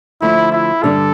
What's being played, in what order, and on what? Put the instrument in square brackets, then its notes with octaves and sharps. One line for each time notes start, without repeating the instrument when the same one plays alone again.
[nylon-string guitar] D3 F3 A3 [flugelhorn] E4
[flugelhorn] E4
[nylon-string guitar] G2 D3 G3 D4 [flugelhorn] A4